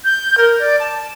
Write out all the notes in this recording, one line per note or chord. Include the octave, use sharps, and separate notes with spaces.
G6
A#4
D5
A5